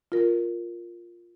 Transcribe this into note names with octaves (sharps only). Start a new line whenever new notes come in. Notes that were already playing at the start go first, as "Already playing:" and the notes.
F4 A#4